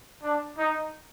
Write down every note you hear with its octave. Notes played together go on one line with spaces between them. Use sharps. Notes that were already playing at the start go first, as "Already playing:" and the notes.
D4
D#4